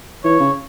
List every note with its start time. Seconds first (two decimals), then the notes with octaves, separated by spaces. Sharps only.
0.24 E3 C#5
0.40 C#3